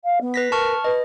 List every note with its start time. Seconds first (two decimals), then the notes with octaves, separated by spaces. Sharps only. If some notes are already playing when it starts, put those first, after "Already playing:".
0.04 F5
0.21 B3
0.34 B4 A#6 B6
0.52 A#4 A5 C#6 F6
0.84 B4 D#5